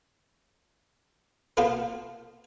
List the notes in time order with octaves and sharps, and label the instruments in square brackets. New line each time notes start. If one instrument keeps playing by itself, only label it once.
[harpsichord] A#3 B3 F4 A4 C5